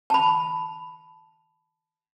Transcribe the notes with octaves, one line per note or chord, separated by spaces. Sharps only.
A5 B5